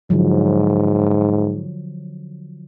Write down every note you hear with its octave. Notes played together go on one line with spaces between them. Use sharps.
G#2 D3 F3 F#3